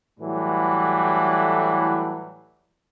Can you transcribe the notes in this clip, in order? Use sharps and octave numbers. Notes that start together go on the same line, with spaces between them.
A2 E3 F#3 G3 A3